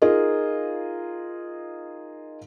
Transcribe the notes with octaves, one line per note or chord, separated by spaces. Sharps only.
D#4 F4 G#4 A#4 D#5